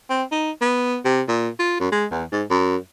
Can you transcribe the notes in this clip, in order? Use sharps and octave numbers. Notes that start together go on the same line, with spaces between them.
C4
D#4
B3
C3
A#2
F4
F#2
G#3
E2
G#2
F#2